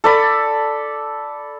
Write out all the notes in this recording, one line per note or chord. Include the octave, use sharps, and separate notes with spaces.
A4 D5 B5